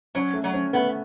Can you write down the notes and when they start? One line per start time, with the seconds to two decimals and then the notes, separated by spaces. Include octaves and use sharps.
0.15 F#3 C#4
0.33 A3
0.44 F#3
0.54 C#4
0.73 A3 B3